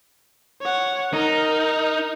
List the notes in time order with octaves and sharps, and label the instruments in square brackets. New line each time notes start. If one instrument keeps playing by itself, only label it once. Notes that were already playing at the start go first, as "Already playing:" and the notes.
[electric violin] C#5 F#5
[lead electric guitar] D#4 [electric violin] A#4